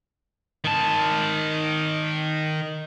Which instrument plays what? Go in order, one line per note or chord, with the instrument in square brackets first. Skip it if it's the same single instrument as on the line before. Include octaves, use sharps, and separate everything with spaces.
[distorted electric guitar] D#3 A5